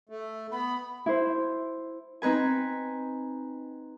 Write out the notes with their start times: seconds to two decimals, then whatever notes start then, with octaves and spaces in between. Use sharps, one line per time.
0.09 A3
0.51 B3 B5
1.06 E4 C5
2.22 C4 D#4 B4 G#5